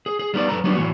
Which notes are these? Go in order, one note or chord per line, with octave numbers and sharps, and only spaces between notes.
G#4
G#4
G3 B3 D#4 D5
F#2 F3 A4 B4 A#5
F#3 G3 B3 D4 D#4
A2 E3 A#3 F#4